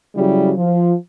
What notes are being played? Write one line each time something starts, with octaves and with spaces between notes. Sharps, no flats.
C#3 F#3 G3 E4 G4
F3